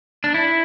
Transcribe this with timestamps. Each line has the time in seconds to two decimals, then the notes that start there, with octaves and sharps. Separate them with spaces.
0.24 D4
0.34 E4